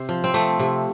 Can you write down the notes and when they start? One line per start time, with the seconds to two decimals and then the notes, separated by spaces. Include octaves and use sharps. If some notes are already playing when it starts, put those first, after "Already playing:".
Already playing: C3 C5
0.09 F3
0.24 C4
0.34 F3 A3
0.59 C3